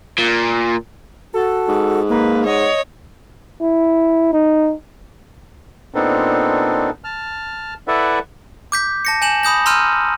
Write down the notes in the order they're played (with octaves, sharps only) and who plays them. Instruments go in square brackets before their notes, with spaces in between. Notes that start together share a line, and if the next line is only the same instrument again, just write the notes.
[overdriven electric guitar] A#2
[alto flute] F#4 [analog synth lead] A4
[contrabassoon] G#2
[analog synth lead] A#3 [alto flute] D#4 [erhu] B4
[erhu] C#5 [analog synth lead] D#5 [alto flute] F#5
[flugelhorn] E4
D#4
[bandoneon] A#2 B3 C4 D4 D#4 A4
A5 F6
E4 A4 B4 D5 E5 F#5
[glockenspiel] D6 G6 B6
A5 A#6 C#7
G#5 G6 E7 F#7
B5 D#6 G6 A#6
A#5 C6 E6 F6 G6 D#7